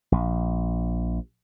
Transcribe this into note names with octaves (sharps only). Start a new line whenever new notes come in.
A#1